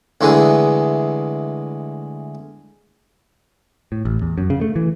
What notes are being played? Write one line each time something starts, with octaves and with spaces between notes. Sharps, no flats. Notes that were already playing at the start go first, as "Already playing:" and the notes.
D2 E3 G#3
A2
A1
E2
F#2
C#3
A3
E3